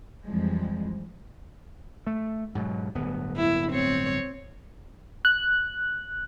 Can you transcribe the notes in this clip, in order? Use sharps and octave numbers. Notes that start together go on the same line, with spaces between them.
F2 E3 F3 G3 G#3
A3
G#2 B2 F#3
D1 G1 B3
E4
C4 C#5
F#6